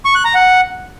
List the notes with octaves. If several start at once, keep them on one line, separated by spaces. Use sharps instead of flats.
C#6
F#6
A#5
F#5